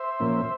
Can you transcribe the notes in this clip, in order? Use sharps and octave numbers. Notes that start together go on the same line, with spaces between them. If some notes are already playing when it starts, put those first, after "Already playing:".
Already playing: C5 E5
A#2 F3 A#3 C#4